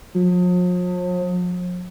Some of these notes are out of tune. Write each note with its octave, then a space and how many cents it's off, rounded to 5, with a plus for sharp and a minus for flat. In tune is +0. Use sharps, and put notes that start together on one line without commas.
F3 +45